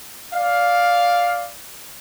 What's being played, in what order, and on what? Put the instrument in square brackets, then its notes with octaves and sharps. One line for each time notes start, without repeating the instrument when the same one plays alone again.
[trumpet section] D5 F5